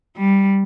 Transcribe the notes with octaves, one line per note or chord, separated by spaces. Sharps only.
G3